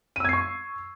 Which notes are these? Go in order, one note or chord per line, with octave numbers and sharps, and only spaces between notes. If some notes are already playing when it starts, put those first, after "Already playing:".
C#6 E6 G#6 C7 D#7